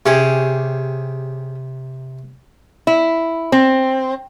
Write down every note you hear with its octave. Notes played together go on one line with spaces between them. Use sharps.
C3 C#4 G4 G#4
E4
C4